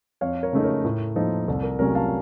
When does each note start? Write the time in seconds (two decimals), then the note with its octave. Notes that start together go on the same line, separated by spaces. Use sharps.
0.21 F2 C#5 F5
0.43 A#4 C#5
0.53 C#3 A3 D#4
0.63 A#4 C#5
0.84 A2 A#4
1.16 F3 A#3 D#4 A4 C5
1.48 C2 A4
1.63 A#4
1.79 C3 F#3 A3 C#4 A#4 C#5
1.95 F5 A5